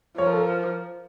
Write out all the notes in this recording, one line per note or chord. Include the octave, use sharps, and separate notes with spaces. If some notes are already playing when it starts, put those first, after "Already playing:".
F3 C#5
A#4
A4
A#4